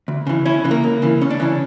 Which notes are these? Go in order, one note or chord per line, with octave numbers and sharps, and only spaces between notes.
D2
C#3 E3
D2 C#4 E4
C#3 E3
A#3
C#2
C#3 E3
C#2 C#4
D4
C#3 E3 C#4